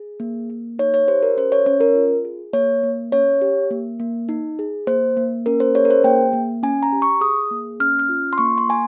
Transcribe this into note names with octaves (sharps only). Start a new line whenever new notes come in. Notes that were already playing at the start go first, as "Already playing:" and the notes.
Already playing: G#4
A#3
A#3
D#4 C#5
C#5
G4 C5
A#4
C#4 C5
C#5
C#4 C#5
A#4
F4
G#4
A#3 C#5
A#3
C#4 C#5
G4
A#3
A#3
D#4
G#4
A#3 C5
A#3
C#4 A#4
C5
G#4 C#5
A#4
C5
A#3 G5
A#3
C#4 G#5
A#5
G4
C#6
G#4 D#6
A#3
C#4 F6
F6
F4
C6
A#3 C#6
C6
A#3 G#5